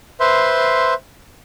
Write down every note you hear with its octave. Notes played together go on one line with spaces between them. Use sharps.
B4 C5 E5 C6